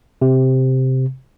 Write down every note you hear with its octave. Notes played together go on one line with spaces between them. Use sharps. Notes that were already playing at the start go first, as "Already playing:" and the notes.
C3